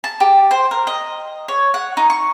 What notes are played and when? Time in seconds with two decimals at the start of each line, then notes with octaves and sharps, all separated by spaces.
0.04 A5
0.20 G4
0.51 C5
0.71 A#4
0.87 D#5
1.48 C#5
1.74 F#5
1.97 D#4
2.10 C#6